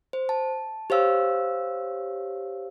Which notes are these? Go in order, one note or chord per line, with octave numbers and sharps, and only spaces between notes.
C5
A5
G4 C5 C#5 F5 E6